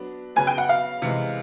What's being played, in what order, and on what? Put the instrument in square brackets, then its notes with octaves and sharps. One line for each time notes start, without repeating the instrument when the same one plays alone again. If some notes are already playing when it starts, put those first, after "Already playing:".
Already playing: [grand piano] F#3 B3 D4
[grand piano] C#3 F#3 B3 [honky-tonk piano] G#5
[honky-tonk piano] G5
F#5
F5
[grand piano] C3 E3 G#3